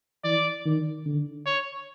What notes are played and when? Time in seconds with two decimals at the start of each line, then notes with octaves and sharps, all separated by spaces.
0.24 E3 D5
0.65 D#3
1.05 D3
1.46 C#5